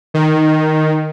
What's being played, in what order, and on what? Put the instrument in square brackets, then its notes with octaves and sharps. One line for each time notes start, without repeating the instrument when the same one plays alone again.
[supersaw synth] D#3